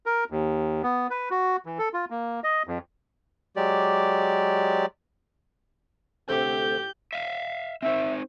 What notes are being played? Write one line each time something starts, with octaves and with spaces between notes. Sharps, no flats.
A#4
D#2
B3
B4
F#4
E3
A4
F4
A#3
D#5
F2
F#3 G#3 G4 D5
D2 C3 A3 G4 G6
E5 F5
C4 D#4 C5 E5